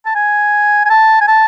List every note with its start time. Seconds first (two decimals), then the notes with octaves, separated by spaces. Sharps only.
0.06 A5
0.15 G#5
0.85 G#5
0.90 A5
1.21 G#5
1.28 A5